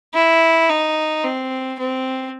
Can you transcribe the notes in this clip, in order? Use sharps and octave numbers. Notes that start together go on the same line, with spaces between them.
E4
D#4
C4
C4